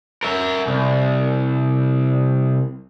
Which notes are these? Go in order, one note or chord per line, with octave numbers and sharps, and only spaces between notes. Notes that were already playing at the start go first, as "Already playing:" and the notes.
A#4 E5
C2